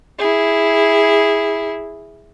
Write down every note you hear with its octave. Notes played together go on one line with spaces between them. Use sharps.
E4 G#4